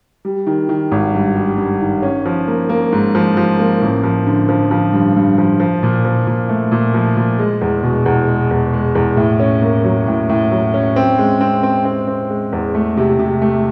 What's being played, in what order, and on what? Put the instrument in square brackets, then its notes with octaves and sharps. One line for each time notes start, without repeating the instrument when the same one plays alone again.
[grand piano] G3
D#3
D#3
G#1
G2
G3
G2
D#3
C#4
F3
A#3
A#3
G#2
F3
F3
A#3
A1
F3
D3
F3
F3
G2
G2
F3
F3
A#2
F3
A#2
A3
A#2
F3
A#2
G#3
E2
B2
E2
G#3
E2
G#3
E2
A2
C#4
A#3
F#3
A2
A2
F#3
C#4
C4
G#3
C4
C4
C4
C4
G#3
E2
A3
C3
C3
A3